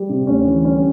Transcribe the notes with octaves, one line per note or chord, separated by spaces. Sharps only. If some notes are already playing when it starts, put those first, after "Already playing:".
Already playing: G3
C3
D2 C#4
E3
G3 C#4